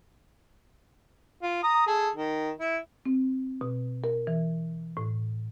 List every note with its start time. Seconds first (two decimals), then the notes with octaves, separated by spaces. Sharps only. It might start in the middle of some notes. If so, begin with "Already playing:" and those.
1.42 F4
1.63 A#5 D#6
1.87 G#4 A4
2.14 D#3
2.60 E4
3.05 C4
3.61 B2
4.04 A#4
4.27 E3
4.97 A2